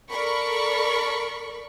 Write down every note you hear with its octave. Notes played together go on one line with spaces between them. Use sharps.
A4 A#4 D5 B5 C#6